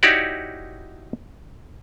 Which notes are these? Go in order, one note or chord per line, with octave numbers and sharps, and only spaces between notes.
D#4 E4 F#4 G4 C#5 D5